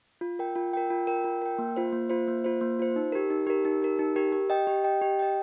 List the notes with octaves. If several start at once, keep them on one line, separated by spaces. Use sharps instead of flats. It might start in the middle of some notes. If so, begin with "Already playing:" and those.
F4
A#4 G5
F4
A#4 G5
F4
A#4 G5
F4
A#4 G5
A#3
F4 C5
A#3
F4 C5
A#3
F4 C5
A#3
F4 C5
D#4
G4 A#4
D#4
G4 A#4
D#4
G4 A#4
D#4
G4 A#4
G4
D#5 G5
G4
D#5 G5
G4
D#5 G5